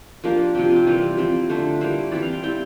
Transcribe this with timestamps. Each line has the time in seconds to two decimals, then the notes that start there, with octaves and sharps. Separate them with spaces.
0.24 F3 A#3 D4 G4
0.55 C3 F3 C4 G4
0.76 G4
0.87 E3 G3 A#3 F4
1.17 F3 C4 E4 G4
1.49 D3 A3 D4 C5
1.81 G3 A#3 E4 C5
2.11 E3 G3 C4 E4 D5
2.22 F5
2.32 G5
2.43 G3 C4 E4 G5